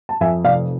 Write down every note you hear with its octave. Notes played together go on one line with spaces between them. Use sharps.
A5
F2 E5 G#5
F1 D5 F5